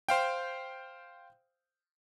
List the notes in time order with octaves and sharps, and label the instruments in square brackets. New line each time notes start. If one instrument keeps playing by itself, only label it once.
[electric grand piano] C5 F5 G5